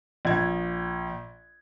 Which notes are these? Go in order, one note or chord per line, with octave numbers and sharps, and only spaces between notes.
A#1 G#6